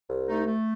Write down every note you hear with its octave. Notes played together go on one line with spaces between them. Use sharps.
C2
A3 D#4
A3